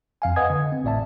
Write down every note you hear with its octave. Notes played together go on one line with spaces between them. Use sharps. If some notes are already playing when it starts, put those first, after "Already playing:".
F2 F5 G#5
B4 D#5 F#5 G#5 D#6 G#6
D3
C4
A1 A2 D5 E5 A5